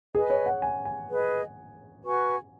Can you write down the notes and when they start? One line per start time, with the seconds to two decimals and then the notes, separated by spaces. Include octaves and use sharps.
0.15 G#4 B4 D#5 G#5
0.30 C#5
0.46 F#5
0.62 G#5
0.85 G#5
1.09 G#4 B4 D#5
2.03 F#4 B4 G#5 C#6